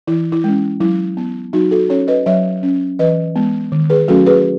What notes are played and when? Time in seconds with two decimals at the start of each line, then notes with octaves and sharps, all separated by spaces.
0.07 E3 E4
0.32 E4
0.44 G#3 C#4
0.80 F#3 E4
1.17 B3
1.53 F#3 D#4 F#4
1.71 F#4 A4
1.89 C#4 A4 C#5
2.08 B4 D#5
2.26 F#3 C#5 E5
2.63 C#4
2.99 E3 B4 D#5
3.36 G#3 B3
3.72 D#3
3.90 G#4 B4
4.08 F#3 A3 C#4 F#4 A4
4.26 G#4 B4